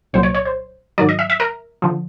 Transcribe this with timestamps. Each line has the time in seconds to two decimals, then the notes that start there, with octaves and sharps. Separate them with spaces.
0.13 C2 A#2 F#3 C5
0.23 C#5
0.34 C#5
0.45 C5
0.98 G#2 D#3 F#3 D5
1.09 D#5
1.19 E5
1.30 E5
1.40 A#4
1.82 D3 F3